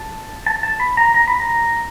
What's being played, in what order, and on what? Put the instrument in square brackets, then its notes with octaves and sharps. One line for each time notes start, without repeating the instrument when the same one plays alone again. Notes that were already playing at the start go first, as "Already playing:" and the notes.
Already playing: [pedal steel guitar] A5
A5
A5
B5
A#5
A#5
B5
A#5